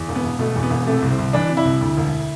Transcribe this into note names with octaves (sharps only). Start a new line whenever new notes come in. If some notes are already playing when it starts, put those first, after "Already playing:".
Already playing: E2
E1
B3
E1
B2 A3
E2
B3
E1
C3 A3
C2
C4
C2
E3 D4
C3
E4
C2
D2
E1